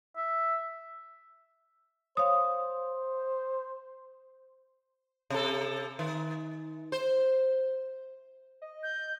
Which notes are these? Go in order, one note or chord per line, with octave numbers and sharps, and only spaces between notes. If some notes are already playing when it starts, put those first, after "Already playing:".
E5
C5 C#5 F5 D#6
C3 A4
D#3
C5
D#5
G6